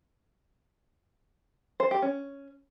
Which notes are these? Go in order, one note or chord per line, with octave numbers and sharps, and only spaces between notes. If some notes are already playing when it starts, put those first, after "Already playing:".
C5
G4
C#4